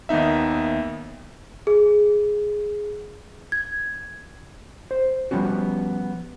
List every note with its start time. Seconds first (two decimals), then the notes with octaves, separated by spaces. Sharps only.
0.09 D#2 A#3 B3 D#4 E5
1.67 G#4
3.52 G#6
4.91 C5
5.31 F3 G3 B3 C#4 F#4